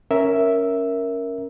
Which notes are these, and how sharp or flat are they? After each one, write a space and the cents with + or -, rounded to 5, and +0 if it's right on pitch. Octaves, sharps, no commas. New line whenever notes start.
C#4 +0 A#4 +0 E5 +0